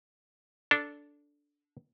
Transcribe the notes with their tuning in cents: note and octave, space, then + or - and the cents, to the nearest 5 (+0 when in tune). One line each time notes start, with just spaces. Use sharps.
D4 -10 A4 +0